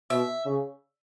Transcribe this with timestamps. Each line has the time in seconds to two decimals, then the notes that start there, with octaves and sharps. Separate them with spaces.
0.10 B2 E5
0.46 C#3